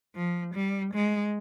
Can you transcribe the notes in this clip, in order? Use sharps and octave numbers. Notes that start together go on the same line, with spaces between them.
F3
G3
G#3